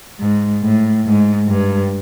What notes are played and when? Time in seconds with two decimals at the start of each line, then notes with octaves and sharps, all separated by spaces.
0.20 G#2
0.63 A2
1.06 G#2
1.48 G2